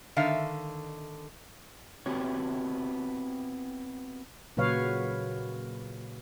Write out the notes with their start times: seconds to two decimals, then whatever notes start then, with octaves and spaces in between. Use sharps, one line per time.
0.16 D3 D#3 E5 F5
2.06 B3 C4 E4 F#4 G4 C#5
4.57 A#2 C#3 F#3 B4 C#5 F5